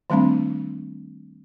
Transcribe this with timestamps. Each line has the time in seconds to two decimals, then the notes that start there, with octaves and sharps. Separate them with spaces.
0.10 D#3 G3 A3 C4 D4